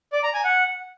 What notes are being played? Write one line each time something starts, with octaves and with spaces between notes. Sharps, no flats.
D5
A#5
G#5
F#5